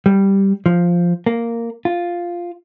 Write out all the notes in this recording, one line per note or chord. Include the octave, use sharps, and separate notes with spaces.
G3
F3
A#3
F4